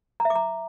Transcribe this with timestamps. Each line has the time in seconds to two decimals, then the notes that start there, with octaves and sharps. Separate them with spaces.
0.20 A#5
0.25 E5
0.30 D6
0.35 A#5